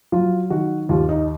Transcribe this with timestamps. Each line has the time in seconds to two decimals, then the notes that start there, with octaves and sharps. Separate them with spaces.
0.12 F#3 F4
0.50 D#3 F#4
0.89 D#2 F4
1.09 D#4